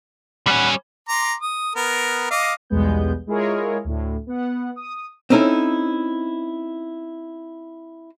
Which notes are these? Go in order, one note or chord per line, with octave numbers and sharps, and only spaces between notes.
G3 C#4 F#5 B5
A#5 C6 D6
D#6
B3 A#4
D#5 F5 D6
B1 E2 G3 G#3 B3 G6
G#3 E4 F4 G#4 A#4 C#5
D2 A2
B3 F#5
D#6
C4 C#4 D#4 E4 A4